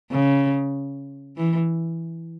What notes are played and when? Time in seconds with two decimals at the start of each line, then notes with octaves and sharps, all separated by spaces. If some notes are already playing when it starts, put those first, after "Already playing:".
0.12 C#3
1.37 E3